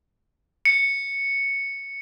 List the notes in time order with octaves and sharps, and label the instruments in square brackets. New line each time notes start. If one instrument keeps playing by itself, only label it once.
[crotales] C#7